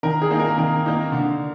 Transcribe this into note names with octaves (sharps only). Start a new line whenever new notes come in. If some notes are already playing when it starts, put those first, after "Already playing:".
D#3 A#4
G#4
A#3 D#4
A#4
D#3 A#4
A#3 D#4
D3